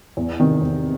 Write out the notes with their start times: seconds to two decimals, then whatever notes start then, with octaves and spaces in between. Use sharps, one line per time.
0.17 E2
0.40 C3 D#3
0.61 E2